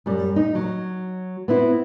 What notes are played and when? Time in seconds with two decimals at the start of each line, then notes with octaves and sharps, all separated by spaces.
0.06 F#2 G3
0.36 D#4
0.55 F#3
1.48 B3 C4 E4